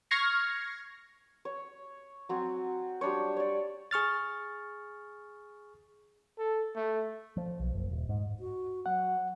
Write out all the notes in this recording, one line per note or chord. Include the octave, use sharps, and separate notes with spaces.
C#6 F6 G#6 A#6 C7 C#7
C#5
F#3 C4 F#4 G#5
G3 D4 C5 C#5
C#5 D5
G#4 C#6 F6 A6
A4
A3
F3
B1
F#1
D#1
G#2
F#4
F#3 F#5